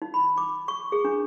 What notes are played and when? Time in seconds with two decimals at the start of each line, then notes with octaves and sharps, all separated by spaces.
0.02 D#4
0.14 B5
0.37 D6
0.68 C#6
0.92 G#4
1.05 D4